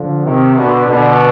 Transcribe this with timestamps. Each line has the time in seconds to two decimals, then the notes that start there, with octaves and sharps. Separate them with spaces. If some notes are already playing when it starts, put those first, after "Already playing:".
Already playing: D3 F3
0.24 C3 D#3
0.56 B2 D3
0.87 B2 D3